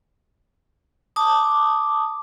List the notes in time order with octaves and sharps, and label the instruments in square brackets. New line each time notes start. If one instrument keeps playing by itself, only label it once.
[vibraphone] A5 D6 D#6